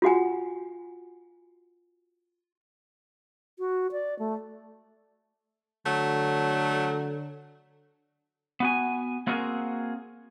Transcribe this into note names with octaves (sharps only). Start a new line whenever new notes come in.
F4 F#4 F#5 G#5
F#4
D5
A3
D3 F#3 A3
B3 F#4 G#5
A#3 C4 F#4 G#4 A#4